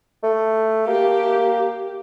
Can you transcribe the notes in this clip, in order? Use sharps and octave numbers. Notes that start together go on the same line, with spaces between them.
A3
A#3 G4